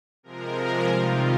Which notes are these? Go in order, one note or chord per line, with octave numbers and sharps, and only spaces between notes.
C3 F3 G#3 A#4
C3 D#3 G3 F4